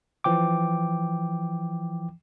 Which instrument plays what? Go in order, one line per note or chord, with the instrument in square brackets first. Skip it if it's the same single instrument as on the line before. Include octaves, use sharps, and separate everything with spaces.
[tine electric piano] E3 F3 G5 D6